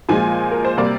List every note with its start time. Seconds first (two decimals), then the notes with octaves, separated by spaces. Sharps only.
0.09 A#2 F3 G#3 G#5
0.52 A#4
0.65 C5
0.77 C3 G3 A#3 D5